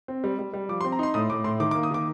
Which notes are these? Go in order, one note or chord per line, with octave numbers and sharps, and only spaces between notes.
C4
G3
G3
G3
F3 D6
C6
C4
A#5
D#4 C6
A2 D#6
A2 D6
A2 C6
D#3 D6
D6
A#3
D#6
D#3 D6